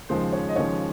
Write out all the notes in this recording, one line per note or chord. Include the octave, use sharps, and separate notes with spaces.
D#2 C#3 F3 G#3 C5
C#5
D#5
D#2 C#3 F3 G#3 C#5